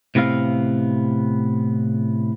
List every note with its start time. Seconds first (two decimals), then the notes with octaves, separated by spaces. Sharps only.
0.15 A2 C3 B3 C4 F5